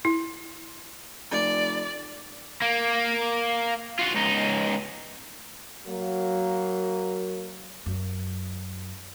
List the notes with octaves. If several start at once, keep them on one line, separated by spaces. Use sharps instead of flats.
E4
F1 D5
A#3
F4 F#4
C#2 D#4
F#3 A#3
F#2